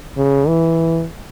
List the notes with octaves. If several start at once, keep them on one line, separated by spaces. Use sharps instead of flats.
C#3
E3